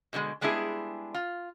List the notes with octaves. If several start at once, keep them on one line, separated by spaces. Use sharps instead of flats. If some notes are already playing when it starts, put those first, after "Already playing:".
B2 D3 F3 G#3
G3 G#3 B3 D4 E4 G#4
F4